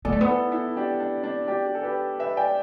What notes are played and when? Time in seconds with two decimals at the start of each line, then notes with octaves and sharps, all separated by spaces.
0.05 B3 A4 D5
0.12 A3
0.21 B3
0.28 E4 A4
0.52 E4 A4
0.76 D4 G4
1.00 D4
1.24 D4
1.47 D4 G4
1.67 G4
1.75 A4
1.83 G4 B4
2.19 B4 E5
2.37 D5 G5